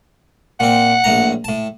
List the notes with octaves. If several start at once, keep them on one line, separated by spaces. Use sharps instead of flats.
A#2 C4 F#5
A#1 A2 A#5
A2 A5